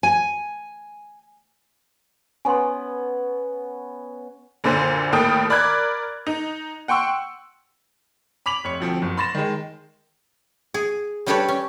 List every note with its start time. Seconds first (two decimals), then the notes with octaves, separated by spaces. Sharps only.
0.03 G#5
2.45 B3 C#4 G#5 C6
4.64 F#1 A#2 D3 D4 C5 G#5
5.12 D#2 A2 D#3 A4 G5 D#6
5.50 A#4 D5 B5 D6 F#6 G#6
6.27 D#4
6.88 F#5 G5 C6 C#6 E6
8.46 B5 D6 B6 F7 F#7
8.64 F1 C#5 C#6 C#7
8.80 D2 F3 C4
9.02 F#1
9.17 B5 C6 A6 A#6 E7
9.35 D#3 G#3
10.74 G#4
11.26 G3 D4 G4 A4 B4 C#5
11.48 C#4